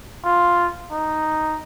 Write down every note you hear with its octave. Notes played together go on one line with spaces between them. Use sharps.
F4
D#4